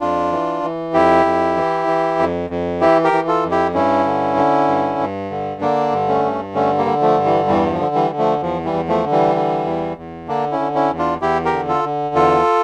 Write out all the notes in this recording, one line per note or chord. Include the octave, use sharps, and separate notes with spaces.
F2 D4 F4
E3
E3
F2 E4 G4
F2
E3
E3
F2
F2
E3 E4 G4
G4 A#4
E3
F4 A4
F2
E4 G4
G2 C#4 E4
D3
D3
G2
G2
D3
D3 A#3 D4
G2
A3 C#4
G2
D3 A3 C#4
G3 A#3
D3
F3 A3
G2
E3 G3
E2 E3 G3
F3
D3
E3 G3
D3
F3 A3
E2 F3
E3 G3
E2
F3 A3
D3
E3 G3
D3
E2
E2
D3 A#3 D4
C#4 E4
D3
C#4 E4
E2
D4 F4
E2 E4 G4
G4 A#4
D3
F4 A4
D3
E2 F4 A4